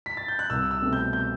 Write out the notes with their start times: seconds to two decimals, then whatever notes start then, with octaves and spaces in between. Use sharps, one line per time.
0.06 B6
0.17 A6
0.28 G6
0.39 F#6
0.50 C2 E6
0.71 E6
0.82 B2 A3 C4
0.93 G6
1.13 G6